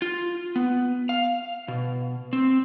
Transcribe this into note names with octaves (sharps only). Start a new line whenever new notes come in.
F4
B3
F5
B2
C4